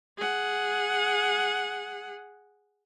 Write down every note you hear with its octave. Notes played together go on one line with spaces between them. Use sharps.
G#4 F#5